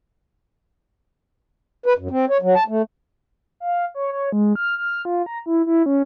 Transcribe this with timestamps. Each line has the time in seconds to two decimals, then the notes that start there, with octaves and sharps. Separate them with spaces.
1.86 B4
1.98 F#2
2.11 C4
2.30 C#5
2.42 F#3
2.56 A5
2.68 A3
3.60 F5
3.95 C#5
4.13 C#5
4.32 G#3
4.55 F6
4.78 F6
5.05 F4
5.26 A#5
5.46 E4
5.66 E4
5.86 C#4